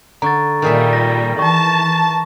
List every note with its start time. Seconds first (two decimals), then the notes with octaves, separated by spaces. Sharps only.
0.22 D3 A#5 C#6 A6
0.62 A#2 D#3 G3 G#4 E5
0.93 A#6
1.39 E3 A5 C#6